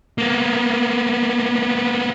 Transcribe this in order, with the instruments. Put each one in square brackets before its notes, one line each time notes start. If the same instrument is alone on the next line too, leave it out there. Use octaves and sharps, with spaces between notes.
[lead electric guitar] A#3 B3